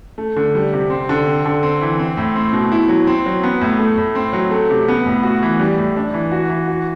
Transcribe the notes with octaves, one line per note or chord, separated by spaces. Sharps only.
A3
D3
G3
C3
C4
D3
C4
D3
C4
E3
C4
A2
C4
B2
E4
F#3
C4
F#3
B3
A2
A3
A2
C4
F#3
A3
C3
B3
A2
F#4
E3
G3
A2
D4
E3
F#4
E3
F#4